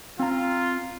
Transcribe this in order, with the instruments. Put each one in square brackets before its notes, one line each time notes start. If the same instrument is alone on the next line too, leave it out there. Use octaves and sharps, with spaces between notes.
[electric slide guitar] C4 A#5 [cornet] F4